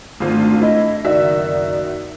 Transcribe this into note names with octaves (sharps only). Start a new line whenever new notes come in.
G#1 A3 D4 F4
E4 D#5
F#1 D#3 D#4 F#4 D5 E5